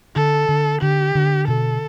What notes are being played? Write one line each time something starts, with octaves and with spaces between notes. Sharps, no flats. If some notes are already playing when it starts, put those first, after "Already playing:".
D3 A4
D3
D3 G4
D3
B2 A4